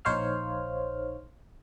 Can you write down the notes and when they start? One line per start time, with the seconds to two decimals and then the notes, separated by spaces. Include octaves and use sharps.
0.05 A#1 D#4 C5 C#5 F5 F6